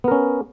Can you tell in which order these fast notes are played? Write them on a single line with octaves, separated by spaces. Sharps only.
B3 A#4 C#4